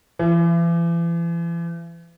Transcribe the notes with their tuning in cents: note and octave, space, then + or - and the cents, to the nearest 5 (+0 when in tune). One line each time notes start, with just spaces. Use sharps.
E3 +40